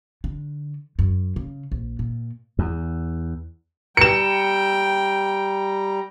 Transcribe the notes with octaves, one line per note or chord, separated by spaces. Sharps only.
D3
F#2
C#3
A#1
A#2
E2
G3 G5 A#5 C#7 E7